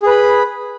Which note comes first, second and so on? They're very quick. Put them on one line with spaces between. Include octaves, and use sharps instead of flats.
G#4 B4 B5